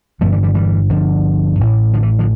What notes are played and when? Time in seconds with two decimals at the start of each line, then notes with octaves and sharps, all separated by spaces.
0.21 G1 G2 D3 F3 A3
0.32 E3 G3
0.43 E3 G3
0.54 E3 G3
0.90 D3 F3
1.59 A1 A2
1.93 D3 F3
2.03 E3
2.19 D3 F3